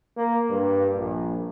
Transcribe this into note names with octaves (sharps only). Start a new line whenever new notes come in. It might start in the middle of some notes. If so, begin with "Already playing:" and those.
A#3
G2
A#1